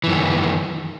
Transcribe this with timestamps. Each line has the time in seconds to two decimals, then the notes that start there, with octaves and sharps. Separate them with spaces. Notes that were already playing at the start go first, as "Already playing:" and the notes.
0.04 E3
0.07 F#2
0.11 D#3